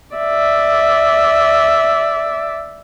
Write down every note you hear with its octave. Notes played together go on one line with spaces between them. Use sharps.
D5 E5